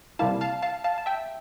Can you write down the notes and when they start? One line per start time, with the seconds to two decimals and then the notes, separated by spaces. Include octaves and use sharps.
0.19 C3 G3 A#3 E4 F5 A5
0.41 F5 A5
0.62 F5 A5
0.84 F5 A5
0.98 A5
1.06 E5 G5